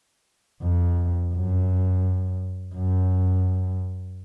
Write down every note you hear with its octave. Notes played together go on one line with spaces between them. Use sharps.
F2
F#2
F#2